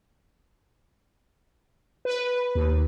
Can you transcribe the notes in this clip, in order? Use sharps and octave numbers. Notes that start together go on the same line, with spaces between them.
B4
D#2